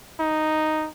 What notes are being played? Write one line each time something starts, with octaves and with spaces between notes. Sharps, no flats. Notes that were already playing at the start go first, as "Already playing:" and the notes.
D#4